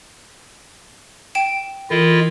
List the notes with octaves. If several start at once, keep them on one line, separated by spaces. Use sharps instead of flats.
G5 D7 E7
E3 E4 F4 A4 A#4 D#5